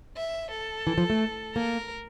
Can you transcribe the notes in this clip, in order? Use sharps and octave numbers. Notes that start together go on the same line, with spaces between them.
E5
A4
E3
F3
A3
A#3 A#4